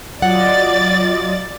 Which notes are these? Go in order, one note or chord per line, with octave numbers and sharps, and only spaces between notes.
F#3 F4 D5 D#5 F#5 A6